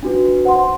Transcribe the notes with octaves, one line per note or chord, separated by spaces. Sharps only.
D4 F#4 B4
C5 F#5 C6